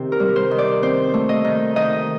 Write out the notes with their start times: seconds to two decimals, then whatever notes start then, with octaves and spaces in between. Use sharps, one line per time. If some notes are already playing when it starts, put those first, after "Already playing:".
Already playing: C3 D#3 C4
0.12 A#4
0.20 G3
0.36 C5
0.51 D#3
0.58 D5
0.82 C4 C5
1.14 A3
1.29 D#5
1.45 D#3
1.76 D#3 D#5